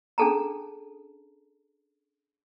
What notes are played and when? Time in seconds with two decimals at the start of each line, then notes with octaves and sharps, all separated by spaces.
0.18 C#4 D4 G#4 A4 A5 A#5